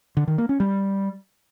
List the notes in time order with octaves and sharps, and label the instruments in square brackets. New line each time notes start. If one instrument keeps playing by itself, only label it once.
[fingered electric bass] D3
D#3
A#3
C#4
G3